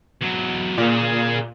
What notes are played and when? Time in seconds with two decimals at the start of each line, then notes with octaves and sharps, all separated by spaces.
0.22 E2 F#3
0.78 A#2 G#4 F5